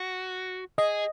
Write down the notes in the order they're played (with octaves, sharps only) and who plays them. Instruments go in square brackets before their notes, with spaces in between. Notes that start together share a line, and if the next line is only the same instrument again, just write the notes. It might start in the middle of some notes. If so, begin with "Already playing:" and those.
Already playing: [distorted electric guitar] F#4
[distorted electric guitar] G#4 [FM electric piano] D#5